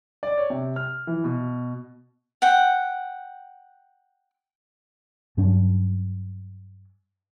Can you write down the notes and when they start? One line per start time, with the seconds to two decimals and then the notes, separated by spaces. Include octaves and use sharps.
0.23 D5
0.38 C#5
0.50 C3
0.76 F6
1.07 E3
1.24 B2
2.42 F#5 G5
5.37 G2 F#3 C#4 D4